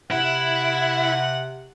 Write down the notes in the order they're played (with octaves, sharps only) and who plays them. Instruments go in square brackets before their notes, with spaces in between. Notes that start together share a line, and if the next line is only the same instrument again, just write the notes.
[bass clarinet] C3 [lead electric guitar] E4 [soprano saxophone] F#5